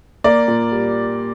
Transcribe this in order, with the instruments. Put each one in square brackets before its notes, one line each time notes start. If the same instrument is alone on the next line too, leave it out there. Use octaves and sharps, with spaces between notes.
[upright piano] A#3 [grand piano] D5
[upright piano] A#2
G3